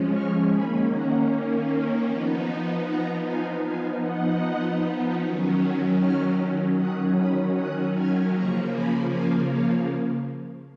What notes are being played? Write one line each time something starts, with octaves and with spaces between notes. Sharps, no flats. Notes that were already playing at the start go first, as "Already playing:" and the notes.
Already playing: F3 G#3 C#4
C#6 F6
D#3 A#3 C#4 G#5 B5
F#5 A#5
F3 B3 D#4
F#5 A#5
F5 G#5
F3 B3 D#4 F5 G#5
D#5 F#5
D#3 F#3 C#4
C#6 F6
D#3 F#3 C#4 D#6 F#6
B5 D#6
D#6 F#6
F6 G#6
C#3 F3 A#3 A#5 C#6
G#5 B5
F5 G#5
C#5 F5